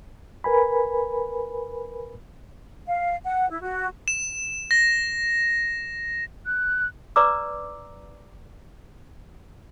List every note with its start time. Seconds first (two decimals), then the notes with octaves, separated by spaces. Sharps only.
0.44 A#4 B4 G#5 B5
2.86 F5
3.25 F#5
3.49 E4
3.61 F#4
4.08 E7
4.71 A#6
6.45 F#6
7.16 B4 D5 A#5 D6 E6